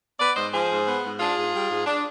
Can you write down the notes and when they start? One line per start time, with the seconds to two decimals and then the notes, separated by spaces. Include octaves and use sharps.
0.19 B3 B4 D5
0.36 G#2 C5 D#5
0.53 F3 G#4 C5
0.69 G#2
0.87 B3
1.04 G#2
1.20 D4 F4 G#4
1.37 G#2
1.54 G3
1.70 G#2
1.86 D4